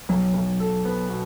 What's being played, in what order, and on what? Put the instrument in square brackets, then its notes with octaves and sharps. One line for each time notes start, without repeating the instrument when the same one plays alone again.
[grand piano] B1 [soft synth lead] F#3
[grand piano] B1
A4
B3
B2